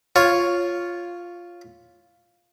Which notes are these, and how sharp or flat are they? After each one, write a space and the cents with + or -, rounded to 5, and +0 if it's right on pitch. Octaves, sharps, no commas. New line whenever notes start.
F4 +0 C#5 +0